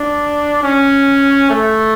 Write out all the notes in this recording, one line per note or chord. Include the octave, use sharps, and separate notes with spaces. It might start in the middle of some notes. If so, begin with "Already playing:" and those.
Already playing: D4
C#4
A3